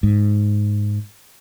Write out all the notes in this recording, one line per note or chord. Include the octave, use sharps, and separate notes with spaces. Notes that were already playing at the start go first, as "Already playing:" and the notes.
G#2